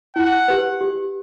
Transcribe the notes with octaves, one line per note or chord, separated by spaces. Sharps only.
E4 F#5
G4 B4
G4